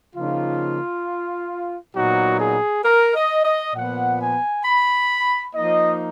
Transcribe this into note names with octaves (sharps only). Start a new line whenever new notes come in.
C#3 F3 A#3 D#4 F4
A#2 F#3 B3 D#4 F#4
G#4
A#4
D#5
D#5
A#2 F3 B3 F#5
G#5
B5
F3 A#3 D#4 D#5